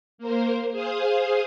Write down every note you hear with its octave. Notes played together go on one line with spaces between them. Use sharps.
A#3 A#4 C5
G#4 C5 F5 D#6